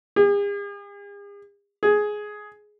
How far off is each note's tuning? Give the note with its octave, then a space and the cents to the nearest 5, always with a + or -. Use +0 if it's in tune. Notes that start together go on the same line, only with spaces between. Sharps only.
G#4 -45
G#4 +10